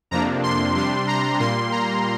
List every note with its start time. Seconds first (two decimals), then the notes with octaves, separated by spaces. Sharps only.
0.11 F2 C3 F3 A#3 D4 A#5
0.43 C6
0.76 C3 G3 D4 C6
1.08 A#5
1.40 A#2 G3 A#3 C6
1.72 A#5